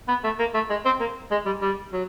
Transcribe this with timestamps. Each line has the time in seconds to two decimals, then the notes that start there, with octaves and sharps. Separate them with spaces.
0.09 B3
0.24 A3
0.39 A#3
0.54 A3
0.70 G#3
0.85 C4
1.00 A#3
1.31 G#3
1.46 G3
1.62 G3
1.93 F#3